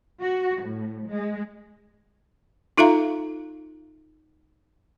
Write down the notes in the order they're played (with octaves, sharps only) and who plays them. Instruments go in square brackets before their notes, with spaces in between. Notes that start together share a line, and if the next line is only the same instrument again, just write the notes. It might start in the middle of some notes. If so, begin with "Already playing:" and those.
[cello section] F#4
A2
G#3
[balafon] D#4 F4 A4 E5 F5 A#5